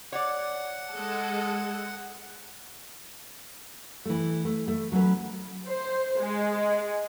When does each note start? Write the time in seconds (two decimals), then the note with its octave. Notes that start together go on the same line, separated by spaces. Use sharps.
0.12 C#5 D5 F#5
0.91 G#3 A4
4.05 E3 A3
4.45 A3
4.68 A3
4.92 F#3 A3 C#4 B4
5.66 C5
6.19 G#3